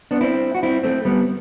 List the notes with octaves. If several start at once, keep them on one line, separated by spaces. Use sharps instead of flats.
B3 D4
C4 E4
F#4
C4 E4
A3 C4
G3 B3